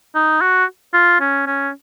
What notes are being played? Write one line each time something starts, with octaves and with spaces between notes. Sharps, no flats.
D#4
F#4
F4
C#4
C#4